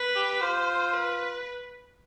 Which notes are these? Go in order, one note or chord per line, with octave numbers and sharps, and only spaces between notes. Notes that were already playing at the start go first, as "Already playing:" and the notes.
Already playing: B4
G4
F4 C5
B4